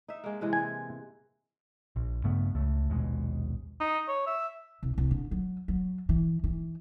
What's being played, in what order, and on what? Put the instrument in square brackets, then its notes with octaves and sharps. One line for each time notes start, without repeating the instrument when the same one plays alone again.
[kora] D#4 E5
G#3 A#3
C3 E3 G#3
[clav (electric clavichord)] G#5
[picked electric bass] A#1
G2 C#3 A3 B3
C#2 C#3 A3
A#1 D#2 B2 G#3
[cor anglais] D#4
C#5
E5
[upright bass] C2
C2
D3
F#3
F#3
E3
E3